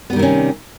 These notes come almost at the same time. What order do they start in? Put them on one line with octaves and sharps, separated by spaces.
B3 G3 D#3 C3 C#4